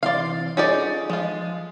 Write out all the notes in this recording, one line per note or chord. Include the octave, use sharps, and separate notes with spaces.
C3 E3 D5 F5 C6
C#4 D#4 F4 G#4 A4 D5
F3 G#3 F4